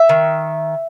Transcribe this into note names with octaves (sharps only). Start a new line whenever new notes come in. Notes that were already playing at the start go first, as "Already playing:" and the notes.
Already playing: E5
D#3